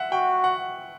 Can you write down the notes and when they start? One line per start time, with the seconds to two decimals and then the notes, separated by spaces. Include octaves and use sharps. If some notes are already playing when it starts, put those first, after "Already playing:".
Already playing: E5 F#5
0.12 F#4 G5
0.44 F#5